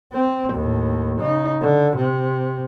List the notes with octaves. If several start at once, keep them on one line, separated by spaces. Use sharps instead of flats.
C4
D#2 A2
C#3 D#4
D3
C3